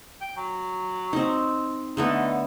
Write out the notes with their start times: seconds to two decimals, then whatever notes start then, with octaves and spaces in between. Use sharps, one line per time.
0.21 G5
0.37 F#3
1.13 C4 D#4
1.97 D3 A3 B3 D#4